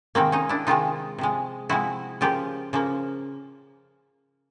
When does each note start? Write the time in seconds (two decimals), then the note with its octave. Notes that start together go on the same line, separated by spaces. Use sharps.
0.15 C3 D#3 G#3 A#3 C4
0.32 C#4 D#4
0.49 D4 E4
0.67 C3 D#3 G#3 D#4 F4
1.18 C3 F3 G#3
1.69 C3 F3 G#3 E4 F#4
2.21 C#3 F3 A#3 F4 G4
2.73 C#3 F3 A#3